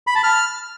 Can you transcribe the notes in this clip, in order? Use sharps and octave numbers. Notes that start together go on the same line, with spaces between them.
B5
A5
F6